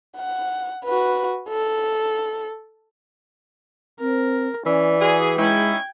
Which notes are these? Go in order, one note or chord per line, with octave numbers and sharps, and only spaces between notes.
F#5
F#4 B4
A4
C4 A#4
E3 C#4 D5
F#4 G#4
G#3 C#4 D#4 E4 G5 G#6